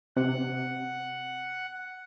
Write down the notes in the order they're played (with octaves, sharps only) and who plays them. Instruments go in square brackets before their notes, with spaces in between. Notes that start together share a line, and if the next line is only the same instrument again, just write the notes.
[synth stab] C3 [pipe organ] F#5